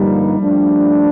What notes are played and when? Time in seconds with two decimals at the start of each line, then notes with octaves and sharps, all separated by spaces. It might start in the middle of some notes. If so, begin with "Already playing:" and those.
Already playing: G2 D3 F3 G3 A#3 D#4
0.39 F3 A3 D4